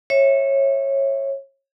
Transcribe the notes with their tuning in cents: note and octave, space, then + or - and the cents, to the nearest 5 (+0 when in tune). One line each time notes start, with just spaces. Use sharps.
C#5 -20 E5 +0